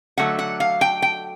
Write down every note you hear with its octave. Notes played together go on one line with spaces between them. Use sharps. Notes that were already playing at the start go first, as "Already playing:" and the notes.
D3 F#3 A3 F#5
F#5
F5
G5
G5